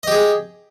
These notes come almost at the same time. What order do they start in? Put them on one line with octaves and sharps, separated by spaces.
D#5 G4 G#4